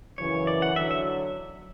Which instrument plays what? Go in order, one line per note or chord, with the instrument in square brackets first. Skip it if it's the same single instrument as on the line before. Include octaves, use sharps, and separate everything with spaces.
[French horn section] F#2 C#3 E3 [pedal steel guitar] C#5
[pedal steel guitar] D5
F#5
[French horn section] D3 F#3 [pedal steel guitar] E5
[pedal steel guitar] E5